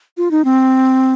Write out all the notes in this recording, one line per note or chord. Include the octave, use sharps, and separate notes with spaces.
F4
D#4
C4